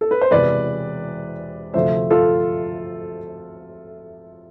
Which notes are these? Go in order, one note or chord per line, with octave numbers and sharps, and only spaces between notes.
A4
B4
C5
E1 E2 C3 B4 D5
D2 C3 F3 A3 C5 E5
F4 A4